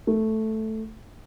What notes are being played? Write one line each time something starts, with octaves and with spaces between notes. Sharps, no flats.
A3